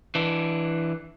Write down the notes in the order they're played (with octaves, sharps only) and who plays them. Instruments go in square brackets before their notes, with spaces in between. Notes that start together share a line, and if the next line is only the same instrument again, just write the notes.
[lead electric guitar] E3 D4